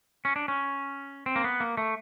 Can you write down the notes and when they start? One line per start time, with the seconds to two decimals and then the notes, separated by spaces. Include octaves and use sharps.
0.25 C#4
0.36 D4
0.48 C#4
1.26 C4
1.36 A#3
1.44 B3
1.60 A#3
1.77 A3